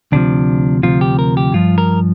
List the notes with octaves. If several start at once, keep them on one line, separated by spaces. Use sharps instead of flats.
D2 C3 F3 D4
D2 C3 F3 F4
G4
A#4
G4
G2 F3 F4
A#4